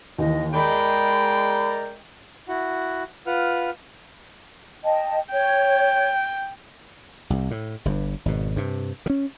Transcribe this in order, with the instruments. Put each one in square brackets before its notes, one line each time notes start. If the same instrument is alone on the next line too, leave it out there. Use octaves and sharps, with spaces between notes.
[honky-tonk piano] D#2 E3 [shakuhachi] D#5
[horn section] G#3 G5 [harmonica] A#4 D5 [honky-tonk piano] D#5 [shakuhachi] B5
[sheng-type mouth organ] E4 F#4 F#5
F4 B4 F#5 F6
[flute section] D#5 G5 A5
[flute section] C#5 [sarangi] G5
[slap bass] C2
A2
G1 G2
G#1 B2
G2 C3
D#3 C#4